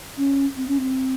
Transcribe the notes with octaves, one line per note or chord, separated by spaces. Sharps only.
C#4
C4
C#4
C4